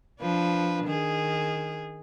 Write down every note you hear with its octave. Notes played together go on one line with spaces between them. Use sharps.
F3 D4 B4
D#3 G#4